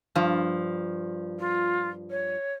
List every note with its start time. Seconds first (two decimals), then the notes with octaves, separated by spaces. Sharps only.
0.15 G2 F3
1.39 F4
2.11 C#5